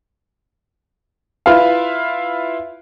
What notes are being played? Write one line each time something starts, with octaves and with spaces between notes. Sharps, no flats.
E4 F4 B4 E5 F5